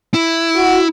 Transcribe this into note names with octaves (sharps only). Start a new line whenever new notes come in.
E4
F#4